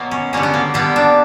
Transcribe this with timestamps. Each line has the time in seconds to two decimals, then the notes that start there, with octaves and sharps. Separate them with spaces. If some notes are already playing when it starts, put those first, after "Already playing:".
Already playing: B2 F#3 A#3 B3
0.11 C#4
0.33 D3 G3 A#3 C#4
0.43 B3
0.54 A#3
0.74 D3 G3 A#3 B3
0.96 D4